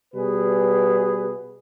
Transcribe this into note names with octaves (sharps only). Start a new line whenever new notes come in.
B2 G3 G#4 B4